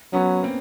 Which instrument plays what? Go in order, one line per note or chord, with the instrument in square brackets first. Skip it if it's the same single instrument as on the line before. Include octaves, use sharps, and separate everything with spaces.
[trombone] F#3 [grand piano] B3 C#4
[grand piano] A#3 C4